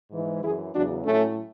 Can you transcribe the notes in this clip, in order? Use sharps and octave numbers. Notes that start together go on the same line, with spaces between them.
G#2 E3
F#2 E3 E4 G#4
E2 C#3 F#3 D4 F#4
A2 F#3 A3 C#4